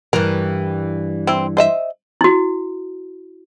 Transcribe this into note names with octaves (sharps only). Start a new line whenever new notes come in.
G2 E3 A#4
C4 E4
C5 D#5 E5
E4 F#4